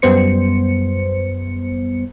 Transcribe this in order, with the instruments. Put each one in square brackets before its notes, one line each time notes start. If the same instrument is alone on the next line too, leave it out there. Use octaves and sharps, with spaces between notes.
[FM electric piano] F#2 G3 B3 C5 C#7